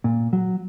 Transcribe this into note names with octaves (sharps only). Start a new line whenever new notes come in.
A#2
F#3